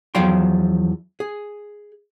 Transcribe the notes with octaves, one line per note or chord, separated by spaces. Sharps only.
E2 F3 F#3 F5 G5 C6
G#4